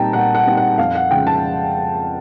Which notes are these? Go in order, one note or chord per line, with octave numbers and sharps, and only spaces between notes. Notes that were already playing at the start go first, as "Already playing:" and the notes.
Already playing: A#2 G3 C4 D#4 G5 A5 A#5
A#2 F#5
F#5
G3 C4 D#4
F#5
F2 F5
F#5
C#3 F3 G#3 G5
A5